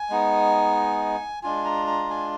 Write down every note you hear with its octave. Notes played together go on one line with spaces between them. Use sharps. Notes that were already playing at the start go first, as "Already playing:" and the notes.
Already playing: G#5
G#3 B3 D#4
G#3 D4 F4 G#5
A#5
A#5
G#5